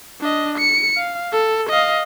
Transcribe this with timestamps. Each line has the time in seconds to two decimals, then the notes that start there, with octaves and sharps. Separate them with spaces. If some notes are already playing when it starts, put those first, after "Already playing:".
0.21 D4 D#5
0.58 C#7
0.97 F5
1.32 A4
1.69 D#5 F5